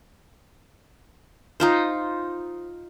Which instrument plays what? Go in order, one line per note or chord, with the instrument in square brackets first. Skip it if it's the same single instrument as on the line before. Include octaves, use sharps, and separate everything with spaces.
[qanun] D#4 F4 C5